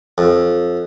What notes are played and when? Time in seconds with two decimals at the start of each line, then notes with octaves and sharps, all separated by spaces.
0.18 F2